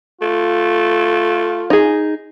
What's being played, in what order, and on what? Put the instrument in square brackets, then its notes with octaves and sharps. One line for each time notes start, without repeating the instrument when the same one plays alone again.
[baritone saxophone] A3 [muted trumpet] F4
[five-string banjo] D#4 G#4